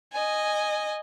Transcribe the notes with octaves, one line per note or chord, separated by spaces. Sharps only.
D#5 G#5